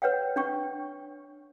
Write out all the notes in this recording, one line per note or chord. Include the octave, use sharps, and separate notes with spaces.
B4 C#5 F#5 G5
D4 G5 C#6